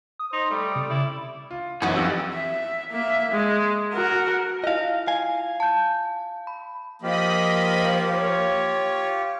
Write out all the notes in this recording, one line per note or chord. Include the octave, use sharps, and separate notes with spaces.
D#6
D#4 C5
G3 A3
C3 A3
C#3 E4 D5
F4
F#2 E3 C#4 D#4 F#4 B4
F2 G4 F#5 E6
E5
A#3 E5
G#3
F#4 A#4
E4 F4 D#5 F5
F5 G#5
A5 G6
B5
F3 A#3 F4 G4 D#5 B5
C#5